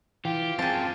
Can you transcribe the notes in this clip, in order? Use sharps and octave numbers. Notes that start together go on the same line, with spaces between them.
E3 F4 G4
F#2 C4 G#4 G5 A5